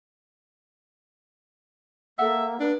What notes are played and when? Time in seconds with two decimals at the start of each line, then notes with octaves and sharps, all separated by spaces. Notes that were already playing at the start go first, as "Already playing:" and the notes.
2.19 A#3 A4 E5 F#5
2.60 D4 B4